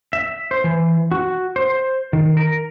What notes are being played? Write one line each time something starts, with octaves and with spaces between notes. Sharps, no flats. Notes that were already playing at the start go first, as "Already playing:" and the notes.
E5
C5
E3
F#4
C5
D#3
A#4